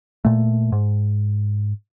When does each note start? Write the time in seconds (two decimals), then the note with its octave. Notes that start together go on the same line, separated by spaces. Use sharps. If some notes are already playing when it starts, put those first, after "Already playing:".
0.25 A#2 A3
0.72 G#2